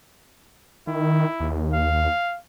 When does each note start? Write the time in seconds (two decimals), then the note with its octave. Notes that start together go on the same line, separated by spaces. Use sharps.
0.87 D#3 E4
1.40 D#2
1.73 F5